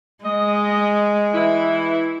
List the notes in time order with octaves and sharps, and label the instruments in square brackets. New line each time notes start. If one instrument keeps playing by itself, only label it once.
[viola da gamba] G#3 [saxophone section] D#5
[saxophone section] E3 E4